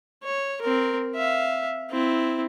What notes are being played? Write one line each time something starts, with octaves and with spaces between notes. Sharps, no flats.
C#5
C4 A#4
E5 F5
C4 E4